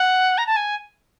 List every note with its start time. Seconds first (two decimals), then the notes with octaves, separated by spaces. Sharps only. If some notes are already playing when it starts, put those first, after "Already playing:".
Already playing: F#5
0.38 A#5
0.47 A5
0.56 G#5